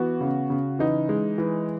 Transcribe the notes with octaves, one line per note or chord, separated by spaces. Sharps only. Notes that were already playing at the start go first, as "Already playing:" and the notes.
Already playing: E3 B3 F#4
C#3
C#3
E3 D#4
G#3
E3